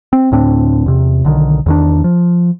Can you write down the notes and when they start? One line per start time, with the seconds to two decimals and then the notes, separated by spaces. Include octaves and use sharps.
0.13 C4
0.32 D2 A2 C4 D4
0.86 E2 C3
1.25 B1 D3 D#3
1.66 E2 D#3 D4
2.04 F3